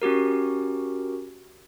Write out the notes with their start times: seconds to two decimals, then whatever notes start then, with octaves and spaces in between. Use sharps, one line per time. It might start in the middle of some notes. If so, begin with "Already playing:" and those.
0.02 C#4 F#4 G4 A#4